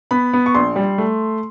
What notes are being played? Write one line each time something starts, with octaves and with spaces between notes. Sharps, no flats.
B3 B5
B3
C#6
A#1 C6
G3
A3